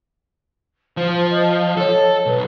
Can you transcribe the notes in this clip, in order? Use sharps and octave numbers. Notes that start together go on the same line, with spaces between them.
F3 C5
D#5
A4 C#5
B1 B4